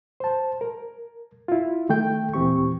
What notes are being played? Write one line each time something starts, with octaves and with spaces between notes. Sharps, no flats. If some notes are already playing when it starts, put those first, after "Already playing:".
C5 A5
A#4
E4 F4
D#3 A3 A4 G5 G6
D#2 A#2 E3 C4 G4 C#6